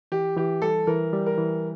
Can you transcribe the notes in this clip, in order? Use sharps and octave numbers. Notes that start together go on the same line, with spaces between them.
E3 G4
E3 G4
G3 A4
E3 A#4
G3
A#4
E3